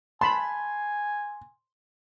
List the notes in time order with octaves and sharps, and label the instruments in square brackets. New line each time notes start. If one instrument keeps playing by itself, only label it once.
[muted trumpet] G#5 [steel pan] A5 B5 [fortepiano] C6